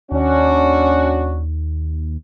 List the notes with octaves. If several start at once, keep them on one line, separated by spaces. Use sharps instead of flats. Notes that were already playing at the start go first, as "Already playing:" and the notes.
D#2 C#4 D4 F#4